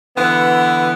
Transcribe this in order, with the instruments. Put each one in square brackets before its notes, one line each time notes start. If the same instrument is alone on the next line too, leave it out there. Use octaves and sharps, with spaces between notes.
[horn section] D3 E3 B3